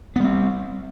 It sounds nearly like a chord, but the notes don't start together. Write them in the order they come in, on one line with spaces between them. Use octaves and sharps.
B3 G3 C4